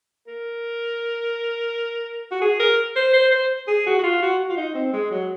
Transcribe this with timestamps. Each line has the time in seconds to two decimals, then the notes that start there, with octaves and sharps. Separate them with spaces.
0.27 A#4
2.31 F#4
2.42 G#4
2.60 A#4
2.96 C5
3.13 C5
3.31 C5
3.68 G#4
3.86 F#4
3.99 F#4
4.03 F4
4.22 F#4
4.39 F#4
4.49 F4
4.57 D#4
4.75 C4
4.93 G#3
5.11 F#3